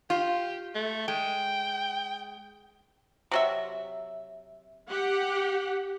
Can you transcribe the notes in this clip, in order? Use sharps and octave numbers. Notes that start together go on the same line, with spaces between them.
F4 G4
A3
G#3 G5
C3 F#3 E5
G4 F#5